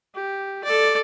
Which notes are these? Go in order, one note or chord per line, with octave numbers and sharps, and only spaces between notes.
G4
A4 D5